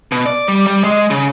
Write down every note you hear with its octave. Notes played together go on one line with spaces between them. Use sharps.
B2
D5
G3
G3
G#3
C#3